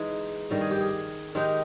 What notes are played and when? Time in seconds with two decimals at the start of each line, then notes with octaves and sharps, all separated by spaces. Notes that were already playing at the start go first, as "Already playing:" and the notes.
Already playing: E3 G#3 D#4 G#4
0.50 G2 D#3 G3 A#4
0.61 G#4
0.71 G4
0.81 G#4
1.35 D#3 G#3 D#4 G4